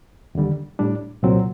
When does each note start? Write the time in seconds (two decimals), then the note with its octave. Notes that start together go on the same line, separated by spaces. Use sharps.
0.35 D#2 D3 G3
0.79 A2 G3 D4
1.23 C2 A#2 F#3 C4